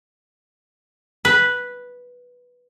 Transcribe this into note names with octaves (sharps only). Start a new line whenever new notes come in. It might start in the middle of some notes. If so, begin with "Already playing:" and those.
B4